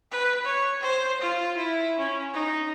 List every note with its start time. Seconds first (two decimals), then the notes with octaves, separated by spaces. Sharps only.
0.12 B4
0.45 C#5
0.82 C5
1.22 F4
1.57 E4
1.99 C#4
2.34 D#4